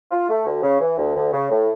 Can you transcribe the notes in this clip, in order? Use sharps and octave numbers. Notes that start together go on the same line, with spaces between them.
F4
A3
D2
C#3
E3
D2
D2
C#3
A2